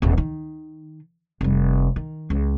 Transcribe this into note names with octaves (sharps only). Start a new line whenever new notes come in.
D#1 D#2
D#3
F1 G3
D#3
C#2